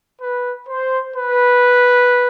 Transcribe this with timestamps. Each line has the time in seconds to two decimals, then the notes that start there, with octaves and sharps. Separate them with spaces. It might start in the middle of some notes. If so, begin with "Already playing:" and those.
0.21 B4
0.68 C5
1.14 B4